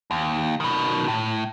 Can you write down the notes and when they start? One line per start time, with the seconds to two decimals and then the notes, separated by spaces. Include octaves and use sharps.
0.11 D#2
0.60 B2 D#3
1.08 A2